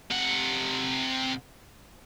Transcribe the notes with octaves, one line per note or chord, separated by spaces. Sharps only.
C3 F#5